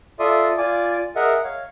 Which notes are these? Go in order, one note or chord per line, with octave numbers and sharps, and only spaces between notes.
F4 A4 D5 E5 C6 D#6
F4 D5 G#5 D6
G#4 A#4 D#5 E5 F#5
C#5 F5